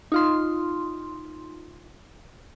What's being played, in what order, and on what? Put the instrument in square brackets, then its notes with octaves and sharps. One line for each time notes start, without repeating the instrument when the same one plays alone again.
[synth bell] D#4 F4 C6